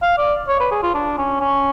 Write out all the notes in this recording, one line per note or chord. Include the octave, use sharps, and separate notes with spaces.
F5
D5
C#5
B4
G#4
F4
D4
C#4
C#4